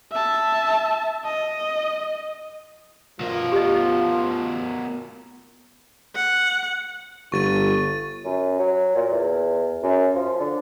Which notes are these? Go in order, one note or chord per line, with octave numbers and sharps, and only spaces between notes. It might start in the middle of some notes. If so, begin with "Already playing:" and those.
E5 A5
D#5
B2 F3 A#4
G4 D#5
F#5
G1 C#6 A6 D#7
F#2
F#3
A#2
E2
F#2
F3
D3